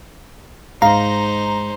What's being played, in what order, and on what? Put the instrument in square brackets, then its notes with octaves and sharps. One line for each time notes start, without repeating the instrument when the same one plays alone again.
[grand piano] G#2 [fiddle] D#4 C5 [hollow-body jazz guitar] F5 [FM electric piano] A#5